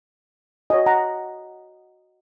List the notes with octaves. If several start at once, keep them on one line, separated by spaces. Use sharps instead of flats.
F#4 C#5 D#5 G#5
F#5 A#5